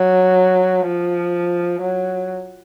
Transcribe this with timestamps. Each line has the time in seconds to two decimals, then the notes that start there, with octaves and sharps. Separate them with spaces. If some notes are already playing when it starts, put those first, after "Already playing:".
Already playing: F#3
0.88 F3
1.81 F#3